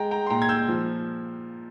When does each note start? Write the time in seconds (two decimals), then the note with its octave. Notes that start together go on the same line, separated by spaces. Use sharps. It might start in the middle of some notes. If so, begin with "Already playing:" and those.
Already playing: G#3 G5 A#5
0.11 G5 A#5
0.26 C6
0.30 A#2 G5 A#5
0.42 G#6
0.49 E6 G6
0.68 F3